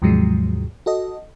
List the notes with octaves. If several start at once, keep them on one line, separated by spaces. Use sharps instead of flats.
D#2 G#2 C3 F3 F#3 G#3
F#4 A4 D#5